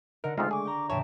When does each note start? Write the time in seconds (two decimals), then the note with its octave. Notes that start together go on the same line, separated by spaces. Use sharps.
0.24 D3 D#4 A#4 F#5
0.38 G#2 G#3 A3 C4 D#4 F4 F6
0.51 G#4 G#5 C#6 D6
0.65 G5 A#5
0.90 E2 A2 C#3 C#5 E5 G5 A5